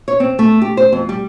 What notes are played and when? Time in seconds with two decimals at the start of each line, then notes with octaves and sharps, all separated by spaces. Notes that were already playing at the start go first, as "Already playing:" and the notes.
0.08 C#5
0.20 C4
0.39 A3
0.62 G4
0.77 C5
0.93 F2
1.09 G3